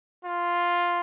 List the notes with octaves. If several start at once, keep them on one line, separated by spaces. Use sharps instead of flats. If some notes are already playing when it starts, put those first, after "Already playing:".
F4